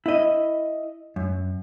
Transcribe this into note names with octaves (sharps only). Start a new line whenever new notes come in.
E4 D#5
F#2